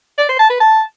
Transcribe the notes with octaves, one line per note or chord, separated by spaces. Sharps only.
D5
C5
A5
B4
A5